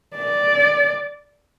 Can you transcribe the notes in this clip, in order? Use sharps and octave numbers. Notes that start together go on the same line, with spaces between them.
D5